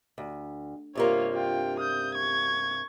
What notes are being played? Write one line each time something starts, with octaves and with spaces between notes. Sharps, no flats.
D2
G2 C3 A#3 F4 C#5
F4 G5
D#6 G6
C#6 G#6